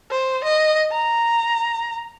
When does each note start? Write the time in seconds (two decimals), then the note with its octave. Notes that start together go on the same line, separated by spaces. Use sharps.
0.11 C5
0.44 D#5
0.92 A#5